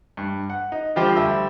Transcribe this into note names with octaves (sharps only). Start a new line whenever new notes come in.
G2
F#5
D#4
D3 F3 G3 F4 G4 C5
D2 G3 E5 E6